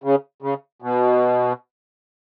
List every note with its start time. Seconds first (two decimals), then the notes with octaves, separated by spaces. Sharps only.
0.04 C#3
0.42 C#3
0.82 B2